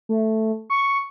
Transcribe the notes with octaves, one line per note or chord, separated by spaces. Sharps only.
A3
C#6